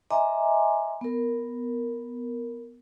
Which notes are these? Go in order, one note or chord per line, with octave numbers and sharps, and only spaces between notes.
D#5 E5 G#5 A#5 C6 D6
B3 A#4